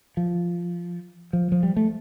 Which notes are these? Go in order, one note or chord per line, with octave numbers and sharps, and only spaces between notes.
F3
F3
F3
G3
A3